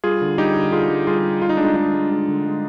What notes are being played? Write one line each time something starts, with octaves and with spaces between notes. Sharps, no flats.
G3 F4 G#4
D3
G3 D#4 G4
D3
D3 F4 G#4
G3
G3 F4 G#4
G3
D3 F4
D#4
G#3 D4
D#4
G#3 D#4
G#3
G#3
D3
G#3